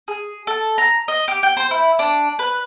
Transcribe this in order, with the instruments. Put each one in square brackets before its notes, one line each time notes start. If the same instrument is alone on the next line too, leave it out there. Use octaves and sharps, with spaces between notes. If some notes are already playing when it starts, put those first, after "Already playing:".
[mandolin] G#4
A4
A#5
D#5
G4
G5
C5
E4
D4
B4